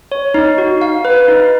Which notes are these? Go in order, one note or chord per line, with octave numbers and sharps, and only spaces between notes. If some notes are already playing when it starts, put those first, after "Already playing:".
C#5
D#4
F#4
F5
B4
D#4